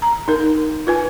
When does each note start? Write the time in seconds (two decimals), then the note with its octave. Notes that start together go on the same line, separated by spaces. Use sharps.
0.02 A#5
0.28 D#4 A#4
0.87 F4 B4 G#5